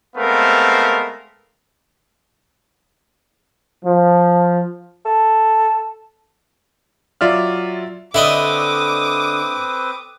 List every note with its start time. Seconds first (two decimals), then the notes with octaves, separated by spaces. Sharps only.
0.17 G#3 A3 B3 C4 A#4 F5
3.84 F3
5.05 A4
7.21 F#3 F4 D5 E5 F6
8.14 D3 C4 E4 B4 D5 D#5 D6 D#6